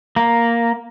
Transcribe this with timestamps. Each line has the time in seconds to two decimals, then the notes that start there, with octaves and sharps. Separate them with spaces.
0.16 A#3